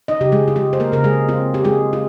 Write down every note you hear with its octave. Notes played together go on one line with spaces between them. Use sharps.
D#4 D#5
C#3 G4
G#3 G#4
F4
G#3 G4
C5
A#3 A#4
C#3 A#4
G#3 G#4
C4 F4
G4
G#3 F4 G#4
F4